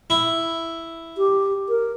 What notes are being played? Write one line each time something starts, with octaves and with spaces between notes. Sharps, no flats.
E4
G4
A#4